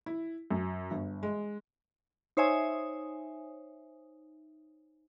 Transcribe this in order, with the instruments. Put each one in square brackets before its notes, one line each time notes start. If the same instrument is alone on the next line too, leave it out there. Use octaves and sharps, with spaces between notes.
[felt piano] E4
F#2
G1
G#3
[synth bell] D#4 C5 C#5 E5 G#5 D#6